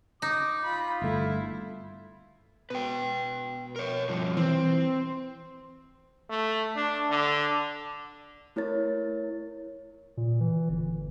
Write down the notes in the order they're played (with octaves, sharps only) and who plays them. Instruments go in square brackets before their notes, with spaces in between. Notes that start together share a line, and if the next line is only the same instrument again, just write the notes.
[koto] D#4 [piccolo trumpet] D6
[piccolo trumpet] F4 [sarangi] B5
[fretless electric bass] G1 A3 [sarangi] E4
[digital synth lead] B2 [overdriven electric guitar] B4 G5
[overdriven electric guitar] A#4 C#5
G2 F3
[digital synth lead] E3 [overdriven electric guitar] C4
[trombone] A3
D4
D3
[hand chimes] A3 E4 A#4 C#5 A6
[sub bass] A#2
E3
G1